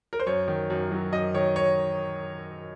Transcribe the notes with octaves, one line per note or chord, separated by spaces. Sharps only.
A#4
C5
F#2 C#5
D#3
F#2
F#3
F#2 D#5
D#3 C#5
C#5